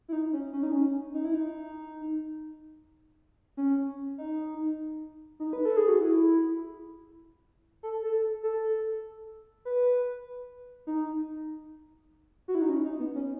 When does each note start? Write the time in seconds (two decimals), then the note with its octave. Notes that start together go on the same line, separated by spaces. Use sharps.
0.09 E4
0.13 D#4
0.33 C#4
0.53 C#4
0.63 D#4
0.72 C#4
1.14 D#4
1.25 E4
1.34 D#4
3.57 C#4
4.18 D#4
5.40 D#4
5.53 B4
5.65 A4
5.77 G#4
5.88 F#4
6.01 E4
7.83 A4
8.03 A4
8.43 A4
9.65 B4
10.87 D#4
12.48 F#4
12.55 E4
12.62 D#4
12.69 C#4
12.84 D#4
13.00 B3
13.15 C#4